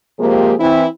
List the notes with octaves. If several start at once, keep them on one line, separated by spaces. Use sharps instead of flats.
C3 F3 G#3 A#3 G4 G#4
E3 C4 E4